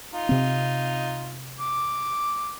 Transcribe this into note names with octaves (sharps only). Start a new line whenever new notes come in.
D#4 F4
C3 C4
D6